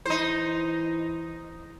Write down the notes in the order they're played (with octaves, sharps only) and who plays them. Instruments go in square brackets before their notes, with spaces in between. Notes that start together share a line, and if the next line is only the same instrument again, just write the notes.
[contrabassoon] E3 [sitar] D#4 C5